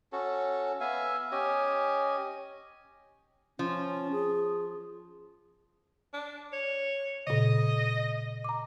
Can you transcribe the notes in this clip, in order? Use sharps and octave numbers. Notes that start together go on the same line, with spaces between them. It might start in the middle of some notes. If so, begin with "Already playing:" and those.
C#4 F#4 A4
B3 E5 F5 G#5
C#4 G4 D#5 G#5
F3 C#4
G#4
D4
C#5
A#2 C#3 D#5
A#5 D6